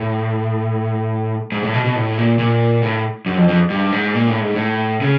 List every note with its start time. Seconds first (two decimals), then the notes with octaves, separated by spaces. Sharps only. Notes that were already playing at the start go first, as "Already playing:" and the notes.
Already playing: A2
1.52 G#2
1.63 A2
1.73 B2
1.84 B2
1.96 A2
2.18 A#2
2.39 A#2
2.83 A2
3.26 F#2
3.37 F2
3.49 F2
3.70 G2
3.92 G#2
4.14 A#2
4.27 A2
4.40 G#2
4.55 A2
5.01 C#3